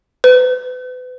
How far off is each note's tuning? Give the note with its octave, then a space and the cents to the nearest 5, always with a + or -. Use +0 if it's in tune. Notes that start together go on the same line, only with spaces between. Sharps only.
B4 +35